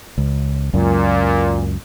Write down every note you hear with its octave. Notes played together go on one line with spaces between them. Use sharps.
C#2
C#2 F#2 A#2